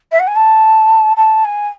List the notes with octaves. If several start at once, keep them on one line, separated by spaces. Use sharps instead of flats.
E5
F#5
G#5
A5
A5
G#5